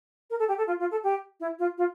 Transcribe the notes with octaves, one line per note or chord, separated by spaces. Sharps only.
A#4
A4
G4
A4
F4
F4
A4
G4
E4
F4
F4